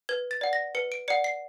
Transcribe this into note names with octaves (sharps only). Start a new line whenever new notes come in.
B4 G#6
A6
D5 F#5
A#6
B4 C#7
D7
D5 F#5 C#7
C7